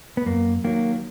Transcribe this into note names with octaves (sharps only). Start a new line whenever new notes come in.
B3
F#2 A#3
D#3 F#3 A#3